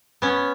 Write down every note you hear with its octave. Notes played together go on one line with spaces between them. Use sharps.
B3 C#4